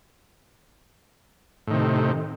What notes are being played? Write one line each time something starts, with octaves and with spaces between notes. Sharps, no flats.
A2 C3 D#3